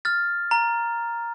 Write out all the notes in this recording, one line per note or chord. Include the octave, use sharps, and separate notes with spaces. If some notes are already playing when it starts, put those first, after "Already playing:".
F6 A6
A#5